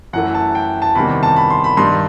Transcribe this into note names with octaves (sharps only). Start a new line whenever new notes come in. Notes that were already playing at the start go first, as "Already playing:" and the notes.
F#2 E3 A3 F#5
A5
G5
A5
E2 C3 D#3 G3 B5
A5
B5
C6
B5
G2 D#3 G3 C6